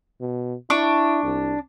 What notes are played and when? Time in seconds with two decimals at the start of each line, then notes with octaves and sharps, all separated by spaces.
0.21 B2
0.70 D4 E4 C#6 D6
1.24 C2